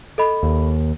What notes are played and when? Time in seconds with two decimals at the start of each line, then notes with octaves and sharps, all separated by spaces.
0.18 A4 D#5 B5
0.43 D#2